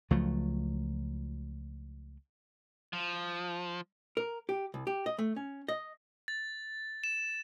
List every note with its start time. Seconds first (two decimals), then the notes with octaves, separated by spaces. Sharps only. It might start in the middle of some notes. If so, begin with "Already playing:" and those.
0.11 C#2 F3 F#3 A3
2.93 F3
4.17 A#4
4.49 G4
4.74 C2
4.87 G4
5.06 D#5
5.19 A3
5.36 C#4
5.68 D#5
6.28 A6
7.04 E7